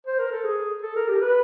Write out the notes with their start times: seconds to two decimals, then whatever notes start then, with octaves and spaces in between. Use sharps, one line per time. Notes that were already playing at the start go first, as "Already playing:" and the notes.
0.07 C5
0.19 A#4
0.32 A4
0.44 G#4
0.83 A4
0.96 A#4
1.08 G4
1.21 B4